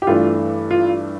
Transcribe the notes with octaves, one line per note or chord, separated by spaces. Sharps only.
G4
G2 E3 A3 D4 F4
F4